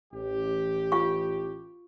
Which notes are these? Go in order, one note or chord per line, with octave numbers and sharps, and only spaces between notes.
A1 G4
F4 F5 C#6